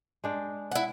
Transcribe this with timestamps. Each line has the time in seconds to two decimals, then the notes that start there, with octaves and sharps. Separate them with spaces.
0.24 G#3 D4 G5
0.71 E4 F#5